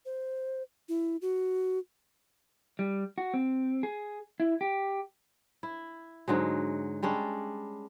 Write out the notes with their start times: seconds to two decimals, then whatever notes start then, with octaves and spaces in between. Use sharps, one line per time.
0.06 C5
0.89 E4
1.22 F#4
2.79 G3
3.18 F#4
3.34 C4
3.83 G#4
4.40 E4
4.61 G4
5.63 E4
6.28 G#2 D3 F#3 G#3
7.03 G3 G#3 C#4 D4